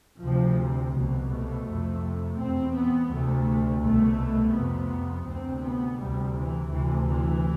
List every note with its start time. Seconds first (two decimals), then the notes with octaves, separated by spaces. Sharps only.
0.22 D2 C3 F3
0.94 C2 B2
1.30 A3
1.67 F2 C3
2.38 E2 B2 C4
2.74 B3
3.10 D2 C3 A3
3.82 C2 B2 A3
4.54 F2 C3 B3
5.26 D2 C3 C4
5.62 B3
5.98 D2 C3 G3
6.34 E3
6.70 D2 C3 E3
7.07 E3